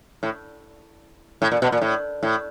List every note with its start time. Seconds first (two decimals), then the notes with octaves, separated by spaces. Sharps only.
0.23 A2
1.42 A2
1.52 A#2
1.62 B2
1.72 A#2
1.82 A2
2.23 A2